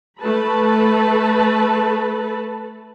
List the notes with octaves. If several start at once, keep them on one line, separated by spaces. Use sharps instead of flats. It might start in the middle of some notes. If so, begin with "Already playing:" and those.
A3 A4 B4 A5 B5